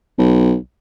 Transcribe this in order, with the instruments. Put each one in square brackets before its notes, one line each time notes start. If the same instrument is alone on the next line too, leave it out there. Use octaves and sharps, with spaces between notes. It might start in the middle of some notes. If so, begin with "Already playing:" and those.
[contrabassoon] B1